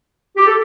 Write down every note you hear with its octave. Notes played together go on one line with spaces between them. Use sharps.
G4
A4